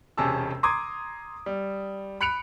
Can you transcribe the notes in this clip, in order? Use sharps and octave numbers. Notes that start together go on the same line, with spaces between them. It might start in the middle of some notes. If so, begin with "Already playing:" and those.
E1 C3 C#4 G#4 A5 E6
A#5 C6 D6 D#6 G#6
G3
B5 F#6 C#7 D7 F7